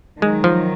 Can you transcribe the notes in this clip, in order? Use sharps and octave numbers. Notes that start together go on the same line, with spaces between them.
D#3 F#3 G#3
F3